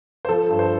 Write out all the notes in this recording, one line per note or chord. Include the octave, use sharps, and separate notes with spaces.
C5
F3 A4
G2
C5